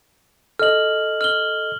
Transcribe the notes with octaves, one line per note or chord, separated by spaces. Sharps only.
A4 D#5 F6 F#7
F6 F#7 G7